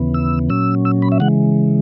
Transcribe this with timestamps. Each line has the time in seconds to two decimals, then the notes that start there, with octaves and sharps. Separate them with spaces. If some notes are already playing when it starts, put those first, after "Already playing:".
Already playing: D#2 C#3 E3 B3
0.14 E6
0.50 A#2 F#3 C#4 E6
0.85 E6
1.02 B5
1.12 E5
1.20 C#3 E3 G#3 F#5